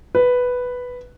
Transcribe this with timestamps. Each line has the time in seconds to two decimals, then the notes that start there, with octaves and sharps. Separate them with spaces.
0.15 B4